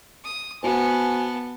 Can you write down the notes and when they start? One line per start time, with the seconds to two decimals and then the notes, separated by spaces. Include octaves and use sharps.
0.25 D#6
0.63 B3 F#4 C5 G#5 A5